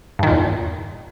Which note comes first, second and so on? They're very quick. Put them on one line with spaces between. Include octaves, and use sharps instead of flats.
G2 D#3 A#2 E2